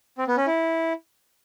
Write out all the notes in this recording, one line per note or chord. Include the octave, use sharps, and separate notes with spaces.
C4
B3
C#4
E4